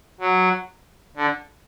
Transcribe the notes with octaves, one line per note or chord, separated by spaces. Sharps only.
F#3
D3